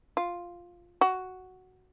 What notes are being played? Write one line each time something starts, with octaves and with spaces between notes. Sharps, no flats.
F4
F#4